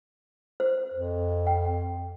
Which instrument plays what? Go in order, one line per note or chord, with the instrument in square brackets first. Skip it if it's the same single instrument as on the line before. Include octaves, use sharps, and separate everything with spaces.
[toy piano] C5
[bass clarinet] F2
[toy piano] G5